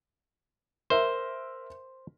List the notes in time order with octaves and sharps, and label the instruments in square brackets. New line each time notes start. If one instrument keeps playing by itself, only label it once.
[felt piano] A#4 E5 [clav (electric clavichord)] C5